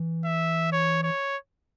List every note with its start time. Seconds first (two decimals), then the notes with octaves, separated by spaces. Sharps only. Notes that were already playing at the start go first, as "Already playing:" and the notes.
Already playing: E3
0.25 E5
0.72 C#5
1.04 C#5